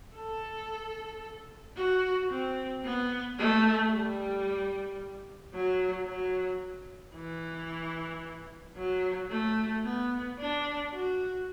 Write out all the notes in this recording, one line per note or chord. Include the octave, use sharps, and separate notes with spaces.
A4
F#4
C4
B3
A3
G3
F#3
F#3
E3
F#3
A3
B3
D4
F#4